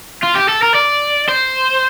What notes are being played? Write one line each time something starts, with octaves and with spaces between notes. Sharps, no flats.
F4
G4
A4
A#4
D5
C5